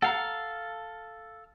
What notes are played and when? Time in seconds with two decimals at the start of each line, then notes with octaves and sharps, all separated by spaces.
0.02 A4 F5 F#5 A#5